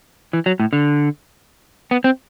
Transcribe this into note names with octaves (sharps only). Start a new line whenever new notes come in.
E3
F#3
A2
D3
B3
C4